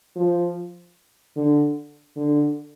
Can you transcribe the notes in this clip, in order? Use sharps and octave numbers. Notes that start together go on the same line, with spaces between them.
F3
D3
D3